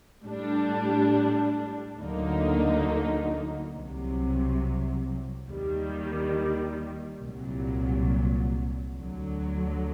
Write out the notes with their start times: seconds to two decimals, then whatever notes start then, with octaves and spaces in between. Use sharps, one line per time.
0.23 A2 G3 D4
1.98 D2 D3 F#3 A#3 D#4
3.73 C2 C3 F#3
5.47 D#2 D#3 G3
7.22 C2 A#2 F#3
8.96 D2 D3 F#3